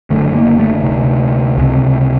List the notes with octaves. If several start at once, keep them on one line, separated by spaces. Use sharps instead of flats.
F#1 F#2 D3 A3
A#3
A3
D2 C3
C#2 C3